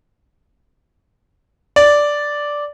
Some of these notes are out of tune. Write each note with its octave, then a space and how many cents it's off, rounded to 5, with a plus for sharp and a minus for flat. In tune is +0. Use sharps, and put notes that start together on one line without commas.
D5 -5